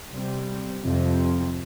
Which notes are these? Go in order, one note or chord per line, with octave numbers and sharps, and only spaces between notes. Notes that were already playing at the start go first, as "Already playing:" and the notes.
C3 G3 C4
F2 C3 F3 C4